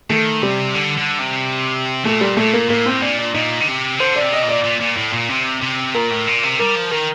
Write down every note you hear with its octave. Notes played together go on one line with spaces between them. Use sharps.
D#3 A3
C3 G3
D3
D3
C3
A#2 A3
G3
A#2 A3
A#3
A2 A#3
C4
A#2 D4
D4
A#2 D#4
D3
C3
D3 C5
D5
C3
D#5
A#2
D5
A#2
A#2
A2
A#2
C3
C3
A#2 A#4
A2
A#2
C3
G3 A#4
F3
D#3 A#4